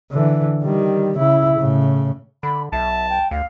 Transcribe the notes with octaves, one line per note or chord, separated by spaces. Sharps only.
D3 E3
D#3 G3
C#3 E4
A2 C#3
D3 B5
B1 E5 A5
G5
D2 F5